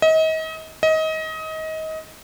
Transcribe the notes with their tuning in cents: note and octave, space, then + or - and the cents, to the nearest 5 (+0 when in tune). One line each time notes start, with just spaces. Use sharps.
D#5 +35
D#5 +25